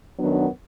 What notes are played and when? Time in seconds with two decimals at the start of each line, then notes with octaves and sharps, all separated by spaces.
0.18 F#2 D#3 F#3 B3 D4